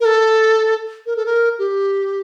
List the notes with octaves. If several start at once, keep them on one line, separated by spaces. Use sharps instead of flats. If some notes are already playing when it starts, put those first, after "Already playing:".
A#4
A4
A#4
A4
A#4
G4